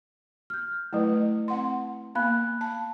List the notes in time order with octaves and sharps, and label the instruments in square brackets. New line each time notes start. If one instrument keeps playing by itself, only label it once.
[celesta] F6 G6
[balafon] F#3 A3 [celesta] E4 B4
[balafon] C4 F#5 C6
[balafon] A#3 B3 [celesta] F5 B5 F#6
[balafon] A5